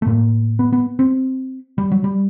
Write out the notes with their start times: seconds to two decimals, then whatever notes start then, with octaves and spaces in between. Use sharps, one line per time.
0.02 A3
0.06 A2 A#3
0.59 B3
0.73 B3
0.99 C4
1.78 G3
1.91 F#3
2.04 G3